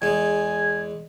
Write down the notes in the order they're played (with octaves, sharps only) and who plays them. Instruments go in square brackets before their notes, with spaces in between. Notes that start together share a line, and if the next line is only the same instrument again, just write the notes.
[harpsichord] E2 G#3 [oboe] G#5